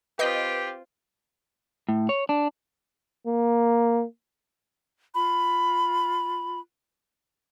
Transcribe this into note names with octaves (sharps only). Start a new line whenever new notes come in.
C4 F4 G4 B4 D#5 G6 B6
A2
C#5
D4
A#3
F4 B5